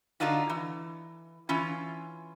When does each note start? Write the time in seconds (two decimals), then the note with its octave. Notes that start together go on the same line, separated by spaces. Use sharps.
0.20 D3 D4 D#4 F4 F#4
0.49 E3
1.49 E3 C#4 F4